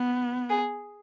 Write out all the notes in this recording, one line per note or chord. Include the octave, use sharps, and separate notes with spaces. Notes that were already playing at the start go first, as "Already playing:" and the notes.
Already playing: B3
G#4